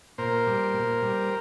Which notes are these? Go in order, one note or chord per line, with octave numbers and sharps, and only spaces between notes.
A#2 A#4 C5
G3
A#2
G3